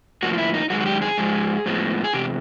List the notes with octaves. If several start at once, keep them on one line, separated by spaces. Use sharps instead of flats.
A2 F3 A#3 F#4
F4
E4
D#4
F#2 D#3 G#3 F#4
F#4
G4
G#4
G#2 F3 G#3
A2 F3 G#3 B3
G#4
E2 C3 G4